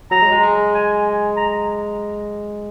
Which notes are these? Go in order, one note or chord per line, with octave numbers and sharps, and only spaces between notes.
F#3 A#5
G#3
G#3
G#3
G#5
A#5